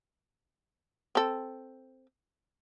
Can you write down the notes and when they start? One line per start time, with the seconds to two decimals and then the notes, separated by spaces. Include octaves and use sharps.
1.15 C4 A4